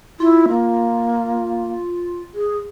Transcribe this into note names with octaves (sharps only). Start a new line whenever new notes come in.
E4 F4
A#3
G#4